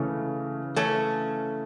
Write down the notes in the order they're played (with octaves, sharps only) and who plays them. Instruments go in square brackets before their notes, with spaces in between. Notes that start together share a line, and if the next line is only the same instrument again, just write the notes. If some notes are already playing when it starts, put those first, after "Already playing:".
Already playing: [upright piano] C#3 E3 [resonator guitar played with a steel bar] A3 C#4
[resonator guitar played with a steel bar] A3 C#4